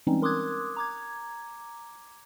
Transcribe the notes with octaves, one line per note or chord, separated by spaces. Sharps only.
E3 G3 G#3 C4 C#4 D#4
A#4 C6 D6 D#6 F#6 G#6
A#5 D6 G#6